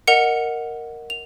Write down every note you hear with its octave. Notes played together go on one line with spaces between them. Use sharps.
A#4 D#5 F#5 C#7 F7
F7